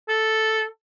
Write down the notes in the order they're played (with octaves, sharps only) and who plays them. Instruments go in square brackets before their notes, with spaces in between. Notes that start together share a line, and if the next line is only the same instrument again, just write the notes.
[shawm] A4